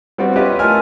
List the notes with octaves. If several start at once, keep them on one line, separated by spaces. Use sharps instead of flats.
G3 B3 C4 F#4
C#4 F4 G4 B4 D#5 E5
A3 F4 A#4 D#5 G#5 F6